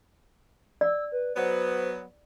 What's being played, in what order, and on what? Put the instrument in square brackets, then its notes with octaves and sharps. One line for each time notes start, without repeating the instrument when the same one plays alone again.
[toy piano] D5 [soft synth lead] E6
[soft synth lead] B4
[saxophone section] F#3 B3 [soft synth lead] C5